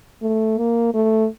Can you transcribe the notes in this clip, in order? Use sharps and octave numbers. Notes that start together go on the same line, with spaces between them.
A3
A#3
A3